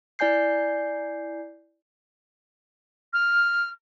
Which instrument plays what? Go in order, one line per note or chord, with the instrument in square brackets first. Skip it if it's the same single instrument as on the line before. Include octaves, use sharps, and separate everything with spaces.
[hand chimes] E4 D5 G#5 G6 C7
[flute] F6